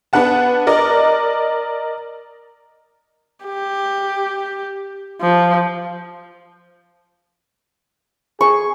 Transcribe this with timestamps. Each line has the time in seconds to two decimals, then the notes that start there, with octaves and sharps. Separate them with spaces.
0.13 B3 D4 B4 F#5 A5
0.67 A#4 D5 D#5
3.45 G4
5.21 F3
8.41 G#4 C#6